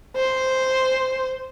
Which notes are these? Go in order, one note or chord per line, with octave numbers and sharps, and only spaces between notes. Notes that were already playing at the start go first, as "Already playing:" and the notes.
C5